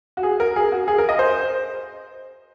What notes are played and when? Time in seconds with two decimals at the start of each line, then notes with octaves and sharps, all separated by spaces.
0.17 F#4
0.23 G#4
0.40 A#4
0.56 G#4
0.72 F#4
0.88 G#4
0.98 A#4
1.09 D#5
1.19 C5